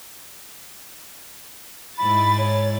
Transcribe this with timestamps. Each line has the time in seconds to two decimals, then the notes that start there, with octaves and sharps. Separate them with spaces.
1.97 G#2 E4 B5 A6
2.38 C#5